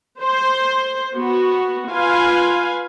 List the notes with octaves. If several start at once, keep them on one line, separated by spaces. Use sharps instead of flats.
C5 C6
B3 F#4
F4 B4 F5 G#5